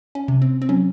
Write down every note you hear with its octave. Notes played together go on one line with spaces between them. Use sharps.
C#4
C3
C4
C4
F#3 C#4